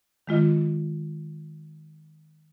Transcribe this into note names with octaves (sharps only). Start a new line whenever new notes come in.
D#3 G#3 F4 D#5